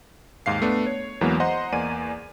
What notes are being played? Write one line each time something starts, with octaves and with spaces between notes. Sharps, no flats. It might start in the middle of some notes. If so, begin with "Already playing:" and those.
D#2 G#2 F5 C7
A3 B3 D4
C#5
E2 E3 F#3 G#3 A#3 B3
C5 D#5 F#5 A#5 C6
E2 A#3 D5 G#5 D#7